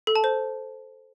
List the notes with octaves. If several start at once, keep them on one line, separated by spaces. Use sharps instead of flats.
A4
A5
C5